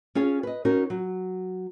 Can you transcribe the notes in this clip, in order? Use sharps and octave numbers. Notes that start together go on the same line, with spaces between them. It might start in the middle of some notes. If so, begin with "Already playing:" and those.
C#4 F4 G#4 C#5
B4 D#5
C#4 D#4 F#4 A#4
F#3